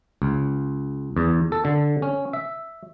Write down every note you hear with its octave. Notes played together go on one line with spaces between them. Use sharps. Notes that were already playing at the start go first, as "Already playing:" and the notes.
C#2
E2
A4
D3
C#4
E5